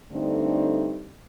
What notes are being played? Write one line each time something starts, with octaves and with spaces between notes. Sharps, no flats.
G2 D3 A3 C4 D#4